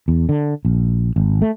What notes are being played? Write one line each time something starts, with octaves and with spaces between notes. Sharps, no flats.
E2
D3
A#1
G#1
A3